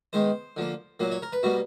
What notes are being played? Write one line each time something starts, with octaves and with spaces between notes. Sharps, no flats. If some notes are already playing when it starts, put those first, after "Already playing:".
D#3 G#3 B3 C5
D3 F3 A#3
A#2 F#3 A#3
C#5
A#4
B4
B2 G3 A#3 F#4